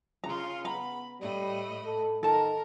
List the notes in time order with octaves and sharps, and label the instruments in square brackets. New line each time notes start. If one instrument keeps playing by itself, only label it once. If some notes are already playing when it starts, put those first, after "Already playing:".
[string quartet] C#3 F4 [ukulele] A#5
[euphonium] B3 [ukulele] A#5 [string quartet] B5
[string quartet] A2 D#5 B5 [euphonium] G3
[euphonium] A4
[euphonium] D#3 [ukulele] A4 A5 [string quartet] A#4